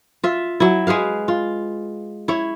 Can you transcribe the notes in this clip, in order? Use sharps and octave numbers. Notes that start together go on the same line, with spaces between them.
F4 E5
F#3 E4
G#3 G#4 B4 F5
F4
E4 C#5